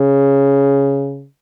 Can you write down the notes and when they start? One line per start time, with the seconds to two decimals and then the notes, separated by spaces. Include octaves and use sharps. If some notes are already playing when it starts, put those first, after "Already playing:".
Already playing: C#3